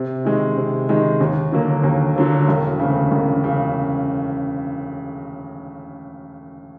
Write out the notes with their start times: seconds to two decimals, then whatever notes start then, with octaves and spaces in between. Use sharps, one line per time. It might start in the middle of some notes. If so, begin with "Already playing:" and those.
Already playing: C3
0.25 D#3 G#3
0.57 C3
0.89 D#3 G#3
1.21 D#2
1.52 D3 F#3 A#3
1.84 D#2
2.16 D3 F#3 A#3
2.48 E1
2.80 D2 C#3
3.11 E1
3.44 C#3